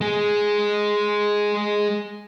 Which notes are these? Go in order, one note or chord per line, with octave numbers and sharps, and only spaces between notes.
G#3 G#4